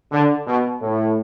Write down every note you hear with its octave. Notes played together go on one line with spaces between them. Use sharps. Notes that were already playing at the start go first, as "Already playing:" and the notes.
D3
B2
A2